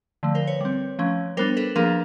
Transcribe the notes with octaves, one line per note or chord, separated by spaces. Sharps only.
D3 F3 A3
A#4 C5
B4 C#5
G3 C4
F3 A3 C#4
G3 B3 D4 A#4 C5
A4 B4
F3 A#3 D4 G#4 A#4